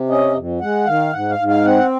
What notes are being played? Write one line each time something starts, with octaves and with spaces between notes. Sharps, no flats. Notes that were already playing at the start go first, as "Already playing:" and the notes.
Already playing: C3
C#4 D#5
F2
G#3 F#5
D#3 F5
G#2 F#5
F5
G#2
F5
C4 F#5